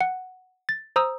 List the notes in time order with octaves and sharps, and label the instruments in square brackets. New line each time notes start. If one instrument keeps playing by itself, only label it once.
[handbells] F#5
A6
C5 A#5 D#6 E6